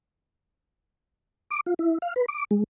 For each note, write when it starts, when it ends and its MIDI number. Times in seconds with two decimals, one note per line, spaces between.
1.50 1.61 86
1.66 1.74 65
1.79 1.98 64
2.02 2.14 77
2.16 2.26 71
2.28 2.44 86
2.51 2.64 56